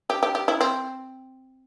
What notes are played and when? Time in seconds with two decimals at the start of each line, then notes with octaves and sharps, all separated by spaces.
0.10 G4
0.23 G4
0.35 G4
0.48 E4
0.61 C4